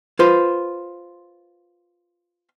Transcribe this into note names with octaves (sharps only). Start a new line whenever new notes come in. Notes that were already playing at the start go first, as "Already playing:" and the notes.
F4 B4 C5